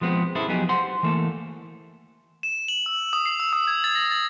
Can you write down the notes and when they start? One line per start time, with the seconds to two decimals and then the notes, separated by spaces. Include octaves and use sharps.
0.01 F3 G#3 B3 C4
0.35 C#4 E4 G#4 A4 C5
0.48 F3 F#3 B3 D#4 G4 G#4
0.69 C5 F#5 C6
1.03 E3 A3 A#3 A4
2.43 E7
2.68 F#7
2.86 E6
3.13 D#6
3.26 C7
3.40 E6
3.53 D#6
3.67 G#6
3.84 A6
3.95 A#6
4.12 A6